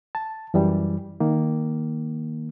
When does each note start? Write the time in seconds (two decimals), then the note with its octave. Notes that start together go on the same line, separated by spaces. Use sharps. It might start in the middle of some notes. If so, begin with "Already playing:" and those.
0.15 A5
0.54 F#2 E3 G3
1.20 D#3 A#3